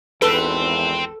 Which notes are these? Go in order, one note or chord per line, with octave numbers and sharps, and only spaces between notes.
G#1 E2 A4 B4 G5 C6